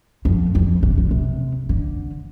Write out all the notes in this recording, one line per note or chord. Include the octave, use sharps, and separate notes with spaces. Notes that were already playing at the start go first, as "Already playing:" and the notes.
F2
F2
C3
D3
C3
D3